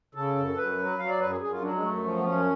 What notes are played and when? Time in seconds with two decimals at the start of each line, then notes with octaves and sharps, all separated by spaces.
0.15 C#3 A4
0.36 F#2
0.57 F#2 B4
0.78 F#3
0.99 F#3 F5
1.09 D5
1.20 F#2 B4
1.30 G#4
1.41 F#2 G#4
1.52 F4
1.61 F#3 D4
1.72 G#3
1.82 F#2 A3
2.03 F3
2.18 B3
2.24 F#2 C#4